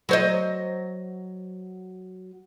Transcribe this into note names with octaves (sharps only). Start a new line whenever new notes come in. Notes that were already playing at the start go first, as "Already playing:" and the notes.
F#3 C5 D#5